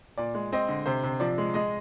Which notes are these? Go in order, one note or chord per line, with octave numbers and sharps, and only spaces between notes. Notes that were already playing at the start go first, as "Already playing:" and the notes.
A#2 D5
G#3
C4 D#5
D3
C3 C5
C3
F3 D5
G#3
G#3 D#5